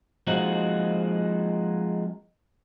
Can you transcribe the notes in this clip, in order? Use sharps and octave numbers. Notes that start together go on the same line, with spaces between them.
F3 G#3 A#3 C4 D#4 F#4